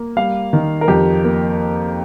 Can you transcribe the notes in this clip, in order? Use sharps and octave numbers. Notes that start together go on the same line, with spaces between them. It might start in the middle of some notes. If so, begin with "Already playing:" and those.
Already playing: A#3
G3 F5
D#3
A#4
F2 G4
A#3